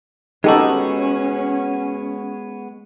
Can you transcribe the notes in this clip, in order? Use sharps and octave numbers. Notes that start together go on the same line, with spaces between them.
G#3 B3 C#4 D#4 F#4 G4 A4